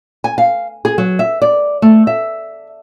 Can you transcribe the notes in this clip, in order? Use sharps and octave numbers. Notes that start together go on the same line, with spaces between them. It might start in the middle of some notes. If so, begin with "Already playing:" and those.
G#5
F5
G#4
F#3
E5
D5
A3
E5